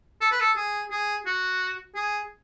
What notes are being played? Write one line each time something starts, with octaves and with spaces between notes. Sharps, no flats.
A4
B4
A4
G#4
G#4
F#4
G#4